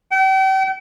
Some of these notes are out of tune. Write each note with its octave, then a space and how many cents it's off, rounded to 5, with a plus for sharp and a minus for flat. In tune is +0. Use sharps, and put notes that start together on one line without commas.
G5 -40